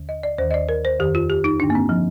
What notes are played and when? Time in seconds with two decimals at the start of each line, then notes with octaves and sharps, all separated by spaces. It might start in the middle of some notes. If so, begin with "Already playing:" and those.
Already playing: D#2 D3
0.09 D#5
0.23 D5
0.38 D#2 D#3 C5
0.51 D#5
0.54 D5
0.69 A#4
0.85 C5
0.99 F2 D#3 G4
1.15 F4
1.30 G4
1.44 D#4
1.59 G2 D3 D4
1.70 A#3
1.75 C4
1.89 F3